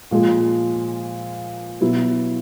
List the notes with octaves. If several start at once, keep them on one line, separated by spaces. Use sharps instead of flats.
A#2 F3 G#3
B2 F#3 B3 E4